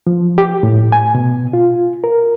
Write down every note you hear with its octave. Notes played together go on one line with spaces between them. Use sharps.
F3
G4
A2
G#5
B2
F4
A#4